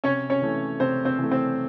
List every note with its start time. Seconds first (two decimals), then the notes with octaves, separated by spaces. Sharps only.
0.04 C3 C#4 C#5
0.30 C#4 C#5
0.42 E3 A3
0.80 C3 C4 C5
1.05 C4 C5
1.18 E3 A3
1.31 C4 C5